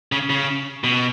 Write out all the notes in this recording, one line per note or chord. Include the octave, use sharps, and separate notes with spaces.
C#3
C#3
B2